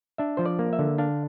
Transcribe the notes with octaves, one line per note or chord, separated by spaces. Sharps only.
D4 E5
F3 C5
D5
A#3
E5
D3
D4 F5